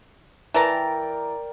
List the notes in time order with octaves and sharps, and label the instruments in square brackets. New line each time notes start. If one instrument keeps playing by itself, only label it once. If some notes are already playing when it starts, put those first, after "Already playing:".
[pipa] E3 A5 A#5 [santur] A#4 D5 G5